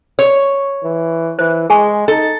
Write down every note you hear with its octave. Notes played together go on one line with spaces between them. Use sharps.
C#5
E3
E3 C5
G#3 G#4 G#5 C#6
D#4 A4